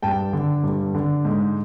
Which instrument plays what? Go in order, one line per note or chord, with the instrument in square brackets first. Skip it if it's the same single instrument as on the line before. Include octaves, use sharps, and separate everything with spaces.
[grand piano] G2 G5 A5
D3
G2
D3
G#2